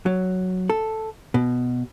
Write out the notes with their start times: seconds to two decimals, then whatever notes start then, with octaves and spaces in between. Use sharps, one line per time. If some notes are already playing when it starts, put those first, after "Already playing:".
0.06 F#3
0.70 A4
1.34 B2